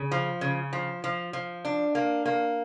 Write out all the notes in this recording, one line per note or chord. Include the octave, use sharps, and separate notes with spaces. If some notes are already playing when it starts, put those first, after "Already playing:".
Already playing: C#3
F3
C#3
F3
F3
F3
D4
A#3
A#3